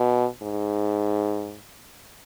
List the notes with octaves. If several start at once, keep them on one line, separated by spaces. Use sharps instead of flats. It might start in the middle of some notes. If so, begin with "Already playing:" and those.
Already playing: B2
G#2